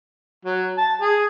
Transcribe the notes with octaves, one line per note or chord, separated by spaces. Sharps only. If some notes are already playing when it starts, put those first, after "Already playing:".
F#3
A5
G#4